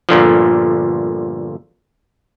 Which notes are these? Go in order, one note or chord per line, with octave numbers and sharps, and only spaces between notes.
G1 A#2 D3 F3